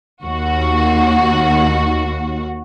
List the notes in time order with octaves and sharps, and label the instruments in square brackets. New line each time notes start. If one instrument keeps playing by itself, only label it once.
[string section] D#2 F#4